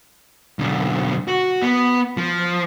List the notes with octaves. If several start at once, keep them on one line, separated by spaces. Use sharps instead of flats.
B1 D3
F#4
B3
F3